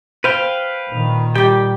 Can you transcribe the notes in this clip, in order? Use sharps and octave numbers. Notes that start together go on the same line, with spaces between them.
B4 C5 F5 G5
A#2 D#3
G3 G4 G5